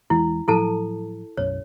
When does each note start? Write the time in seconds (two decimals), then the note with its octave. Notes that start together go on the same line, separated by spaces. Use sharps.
0.10 E2 E3 G#3 E4
0.48 A2 F3 F#3 E4 A4 A5
1.37 B1 F#2 C#5